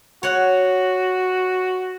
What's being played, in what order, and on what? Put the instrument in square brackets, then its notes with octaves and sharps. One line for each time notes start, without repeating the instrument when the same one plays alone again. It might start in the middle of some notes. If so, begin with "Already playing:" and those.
[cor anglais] F#4 [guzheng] C#5 F#5